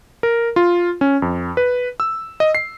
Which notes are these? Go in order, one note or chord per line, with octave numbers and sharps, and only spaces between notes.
A#4
F4
C#4
F2
B4
E6
D#5
C7